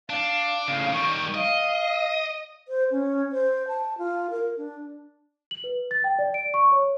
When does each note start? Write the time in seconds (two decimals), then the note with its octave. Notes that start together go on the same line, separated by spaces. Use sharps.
0.10 D4 F5
0.68 A2 C#3 F5
0.93 D#3 G3 C#6
1.35 D#5 F5
2.68 C5
2.91 C#4
3.32 C5
3.68 A5
3.98 F4
4.30 A#4
4.57 D4
5.51 F#7
5.64 B4
5.91 A6
6.04 G5
6.19 D5
6.34 D7
6.54 C#6
6.72 C#5